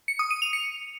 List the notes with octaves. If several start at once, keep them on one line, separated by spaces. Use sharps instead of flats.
C#7
D#6
D#7
F7
C#7